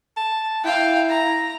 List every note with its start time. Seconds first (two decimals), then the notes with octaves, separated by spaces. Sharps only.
0.16 A5
0.64 E4 F5 G5
1.10 A#5